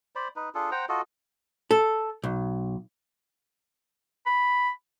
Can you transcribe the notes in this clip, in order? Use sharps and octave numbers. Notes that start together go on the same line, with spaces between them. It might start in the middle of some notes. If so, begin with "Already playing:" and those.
C5 D5 B5
D#4 B4
D4 F4 G#4 A4
C5 F#5 G5 A#5
F4 F#4 A4 D#5
A4
B1
B5